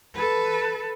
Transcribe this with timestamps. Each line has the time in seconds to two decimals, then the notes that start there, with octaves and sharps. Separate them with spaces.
0.14 A4 B4